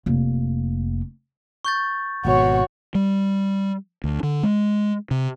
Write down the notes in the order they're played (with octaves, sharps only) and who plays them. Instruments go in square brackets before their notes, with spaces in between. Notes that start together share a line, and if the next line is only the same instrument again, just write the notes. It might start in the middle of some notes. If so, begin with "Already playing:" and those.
[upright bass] F1 A#3
[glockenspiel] C#6 G6 A6
[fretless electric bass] G#1 B2 [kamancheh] F#4 C#5
[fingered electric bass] G3
D2
D3
G#3
C3